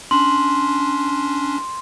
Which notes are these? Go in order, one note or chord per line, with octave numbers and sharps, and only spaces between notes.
C#4 D4 C6